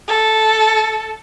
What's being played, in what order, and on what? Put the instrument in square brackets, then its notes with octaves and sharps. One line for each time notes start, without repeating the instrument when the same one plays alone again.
[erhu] A4